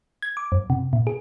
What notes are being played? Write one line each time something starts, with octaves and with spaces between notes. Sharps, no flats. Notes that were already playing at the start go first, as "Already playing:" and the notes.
G#6
D6
F#2
C3
A#2
G#4